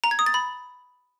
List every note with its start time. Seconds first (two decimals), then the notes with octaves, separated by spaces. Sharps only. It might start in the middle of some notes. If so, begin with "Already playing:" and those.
0.04 A#5
0.11 G#6
0.19 D#6
0.26 A6
0.34 B5